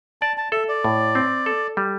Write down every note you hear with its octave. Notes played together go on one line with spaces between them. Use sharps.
D5 A5
A5
A4 E5
D5
A2
C4
A4
G3